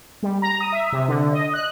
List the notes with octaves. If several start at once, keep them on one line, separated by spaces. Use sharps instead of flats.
G3
A#5
D#6
E5
C3
D3
D#5
F#6